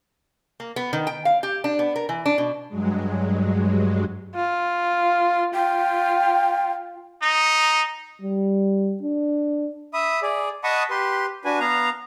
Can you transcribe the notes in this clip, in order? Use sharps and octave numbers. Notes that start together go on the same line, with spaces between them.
A#3
B3
D#3
G5
F5
G4
D4
B3
A#4
E3
D4
B2
G2 F#3 G#3
F4
F4 G5
D#4
G3
D4
E5 B5 D#6
G#4 D5
D#5 F#5 A5 B5 C#6 D#6
G4 B4 C6
D4 F#4 B4 G#5
B3 F5 A#5